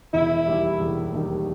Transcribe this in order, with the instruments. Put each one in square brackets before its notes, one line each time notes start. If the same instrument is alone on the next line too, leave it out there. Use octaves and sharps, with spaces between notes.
[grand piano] E1 [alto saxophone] E4
[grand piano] D#2 D#3 G3
E1
D#2 D#3 G3